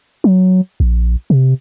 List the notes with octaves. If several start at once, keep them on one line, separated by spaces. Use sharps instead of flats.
F#3
A#1
C3